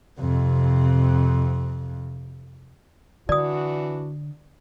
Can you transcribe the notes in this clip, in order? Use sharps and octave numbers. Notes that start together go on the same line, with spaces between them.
F2 C3
D3 E3 D4 F#4 D5 D#6